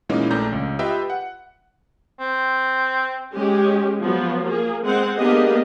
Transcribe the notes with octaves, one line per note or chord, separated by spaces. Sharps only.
A#2 E3 G#3 A#3 C#4 D#4
A#1 A3 D4 D5 A#5 G6
C#2 C#4
F4 G4 B4 D#5 E5 G5
F#5
C4
G#3 C#4 G4
F3 F#3 B3
A#3 G#4
G#3 C4 F#5
A#3 B3 D4 G4 G#4 D#5